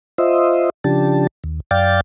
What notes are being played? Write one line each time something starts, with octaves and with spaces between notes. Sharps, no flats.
F4 C5 D#5 E5
C#3 F3 D4 G4 A5
D#2
F#2 D5 F5 G5 A6